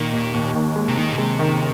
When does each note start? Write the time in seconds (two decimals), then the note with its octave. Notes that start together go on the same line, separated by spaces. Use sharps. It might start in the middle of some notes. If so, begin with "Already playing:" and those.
Already playing: A#2 D#3
0.13 D#2
0.34 D#2
0.55 D#3
0.76 G#3
0.88 C3
0.97 D#2 D#3
1.11 A#2
1.17 C3 G#3
1.39 D#3